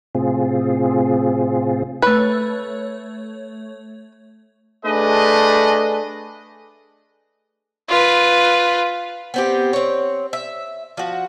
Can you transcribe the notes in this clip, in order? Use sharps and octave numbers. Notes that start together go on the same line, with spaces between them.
A2 C3 C4 F4 G#4
A3 B4 C#5
A3 D4 G#4 B4 D#5
F4 B4
B3 C4 G4
C4 C#5
E5
F3 F#4